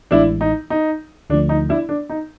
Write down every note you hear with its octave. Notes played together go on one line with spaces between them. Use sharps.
A1 A2 E3 G#3 D4 E4
D#4
D#4
D2 D3 F3 A3 D4
D#4
D4 E4
D4
D#4